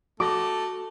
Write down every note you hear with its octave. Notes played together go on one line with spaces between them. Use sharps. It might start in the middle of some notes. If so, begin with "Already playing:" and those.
A3 F#4 A4 D6 A#6